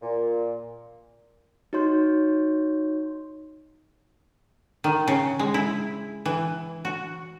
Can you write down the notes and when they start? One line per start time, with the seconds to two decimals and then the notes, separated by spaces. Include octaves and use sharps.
0.02 A#2
1.73 D#4 F#4 C#5 C6 G6
4.84 D#3
5.08 C#3
5.39 G#3
5.54 E4
6.26 E3
6.85 F#4